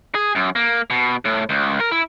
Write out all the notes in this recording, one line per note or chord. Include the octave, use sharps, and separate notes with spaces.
G#4
F#2
A#3
B2
A2
C#2
A#4
E4